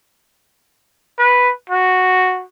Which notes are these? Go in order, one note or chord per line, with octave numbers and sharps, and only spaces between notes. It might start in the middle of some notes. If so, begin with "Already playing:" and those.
B4
F#4